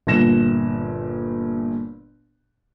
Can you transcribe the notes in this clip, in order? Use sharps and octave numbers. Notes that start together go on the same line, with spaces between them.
G1 A#2 A#6 E7